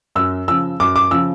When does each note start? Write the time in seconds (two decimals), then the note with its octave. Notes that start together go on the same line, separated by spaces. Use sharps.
0.15 F#2 E6
0.48 C#3 F3 E6
0.80 F#2 D6
0.96 D6
1.11 C#3 F3 E6